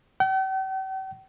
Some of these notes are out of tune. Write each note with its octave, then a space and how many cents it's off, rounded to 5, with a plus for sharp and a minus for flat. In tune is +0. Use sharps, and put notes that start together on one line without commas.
G5 -45